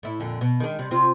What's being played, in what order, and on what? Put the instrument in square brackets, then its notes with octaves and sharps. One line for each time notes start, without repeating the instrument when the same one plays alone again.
[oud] A2 E4
F2 A#2 D3
B2
D#3 G#3 D4
C3 G3
C3 C4 F4